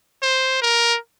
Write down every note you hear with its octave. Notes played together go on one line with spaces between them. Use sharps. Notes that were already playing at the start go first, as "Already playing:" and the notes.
C5
A#4